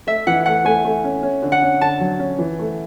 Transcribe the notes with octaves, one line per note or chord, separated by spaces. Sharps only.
A3 E5
E3 F#5
A3 F#5
A3 G#5
A3
C#4
C#4
D3
F#5
C#4
D3 A5
F#3
C#4
E3
A3